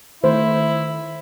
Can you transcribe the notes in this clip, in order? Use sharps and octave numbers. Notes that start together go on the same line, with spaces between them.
D#3 A3 E4 C5